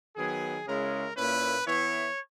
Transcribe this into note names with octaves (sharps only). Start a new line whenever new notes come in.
D#3 F#3 B3 G#4
C#3 G#3 C#4 E4 A#4
A#2 A#3 C#4 E4 B4
E3 B3 E4 C#5